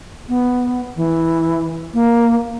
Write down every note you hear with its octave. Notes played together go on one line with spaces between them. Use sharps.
B3
E3
A#3